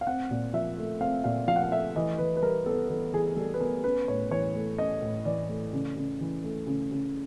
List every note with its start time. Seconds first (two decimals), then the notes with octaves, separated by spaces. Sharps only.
0.01 F5
0.07 C4 F#5
0.31 A#2
0.53 F3 E5
0.78 A3
1.01 C4 F5
1.24 A#2 F5
1.47 F3 F5
1.56 F#5
1.63 F5
1.71 A3 E5
1.96 E3 D#5
2.18 E3 B4
2.37 B4
2.42 G3 A#4
2.66 B3 A4
2.89 E3 A4
3.13 E3 G#4
3.37 G3 A4
3.54 B4
3.61 B3 A#4
3.84 C#4 B4
4.08 A2 C#5
4.31 E3 C#5
4.55 A3
4.78 C#4 D#5
5.02 A2
5.25 E3 D5
5.49 A3
5.73 C#3
5.96 C#3
6.20 E3
6.44 A3
6.67 C#3
6.91 C#3